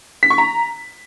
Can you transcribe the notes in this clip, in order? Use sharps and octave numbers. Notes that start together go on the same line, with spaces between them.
B6
C#6
A#5